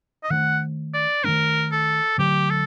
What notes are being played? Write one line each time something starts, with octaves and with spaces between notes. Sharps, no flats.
D#5
D#3 A3 D4 F#5
D5
D#3 A3 D4 A#4
A4
D3 F#3 A3 G4
A4